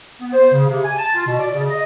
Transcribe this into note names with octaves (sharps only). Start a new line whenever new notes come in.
B3
C5
C#3
C3
G#5
A5
F4
B2
D5
C#3
D#5